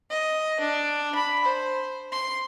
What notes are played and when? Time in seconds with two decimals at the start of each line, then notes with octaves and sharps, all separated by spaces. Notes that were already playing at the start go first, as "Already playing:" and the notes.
0.10 D#5
0.60 D4
1.15 B5
1.45 C5
2.12 C6